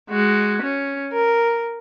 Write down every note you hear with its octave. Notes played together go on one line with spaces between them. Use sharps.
G#3 F#4
C#4
A#4